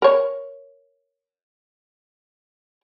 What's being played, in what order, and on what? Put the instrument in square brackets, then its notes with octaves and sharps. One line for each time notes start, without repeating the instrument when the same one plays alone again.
[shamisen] A#4 C#5